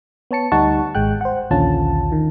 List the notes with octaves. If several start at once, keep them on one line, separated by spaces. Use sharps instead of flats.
B3 C#5 A5 C#7
D2 G3 D#4 F#5 A5 C#6
G#1 G#3 G5 F#6
C5 F#5
A#1 D#2 D3 C#4 F4 A5
D#3